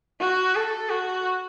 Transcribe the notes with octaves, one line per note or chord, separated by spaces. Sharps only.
F#4
A4
F#4